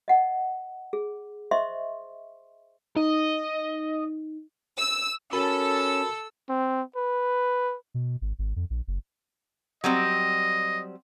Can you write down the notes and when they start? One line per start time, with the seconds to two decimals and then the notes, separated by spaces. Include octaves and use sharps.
0.08 D#5 F#5
0.93 G#4
1.51 C5 D#5 E5 C6 C#6
2.96 D#4 D#5
4.78 E6
5.33 C#4 F#4 A4 A#4 B5 E6
6.49 C4
6.96 B4
7.94 B2
8.21 G#1
8.39 G#1
8.56 F2
8.70 A#1
8.87 F#1
9.84 F#3 G3 C4 D#5